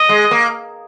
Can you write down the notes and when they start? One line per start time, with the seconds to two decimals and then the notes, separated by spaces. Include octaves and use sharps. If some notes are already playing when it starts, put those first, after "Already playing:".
Already playing: D#5
0.09 G#3
0.31 A#3